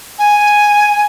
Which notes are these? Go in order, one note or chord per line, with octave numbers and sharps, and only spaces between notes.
G#5